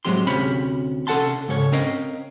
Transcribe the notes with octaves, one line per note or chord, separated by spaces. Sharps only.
A2 F#3 G#3 C4 G4 C6
D2 C3 C#4 B5
C3 C#4 A4 F#5 A5 C6
G#2 C#3 A4 C#5
C4 C#4 A#4 D#5 F5 G5